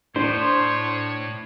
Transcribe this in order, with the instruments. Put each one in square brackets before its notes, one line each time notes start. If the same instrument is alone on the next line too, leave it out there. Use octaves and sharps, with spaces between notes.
[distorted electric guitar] A2 [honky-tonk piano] D4 [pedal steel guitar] C5 [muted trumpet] C#5